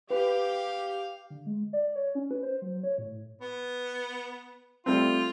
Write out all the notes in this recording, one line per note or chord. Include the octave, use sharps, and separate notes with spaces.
G4 B4 F5
D3
G#3
D5
C#5
C#4
B4
C5
F#3
C#5
A2
B3
G3 A3 C4 F4